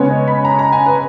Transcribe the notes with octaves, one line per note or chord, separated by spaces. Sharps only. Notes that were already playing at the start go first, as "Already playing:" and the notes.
Already playing: C#3 G#3 B3 C#5
D#5
B5
A#5
A#5
G#5
B4